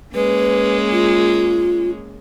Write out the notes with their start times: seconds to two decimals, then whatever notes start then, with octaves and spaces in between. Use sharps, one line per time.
0.15 G#3 A#3 C#4 B4
0.92 F4